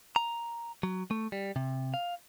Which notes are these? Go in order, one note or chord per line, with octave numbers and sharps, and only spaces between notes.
A#5
F#3
A3
G3
C3
F5